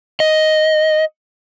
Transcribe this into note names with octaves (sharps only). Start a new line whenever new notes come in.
D#5